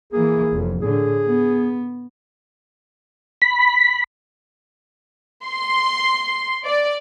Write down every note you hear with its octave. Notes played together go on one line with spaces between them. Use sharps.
E3 A#3 G#4
F1 F2
A2 D3 G#4
B3
B5
C6
D5